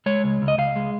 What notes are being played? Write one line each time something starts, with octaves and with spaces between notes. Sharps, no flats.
G#3 C#5
C#2
C#2
D#5
C#2 F5
G#3